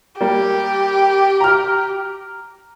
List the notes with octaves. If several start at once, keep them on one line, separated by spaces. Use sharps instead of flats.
G3 A#3 G4
A#5 F6